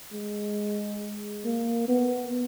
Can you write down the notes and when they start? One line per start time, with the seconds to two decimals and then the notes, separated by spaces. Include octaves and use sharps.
0.13 G#3
1.45 A#3
1.88 B3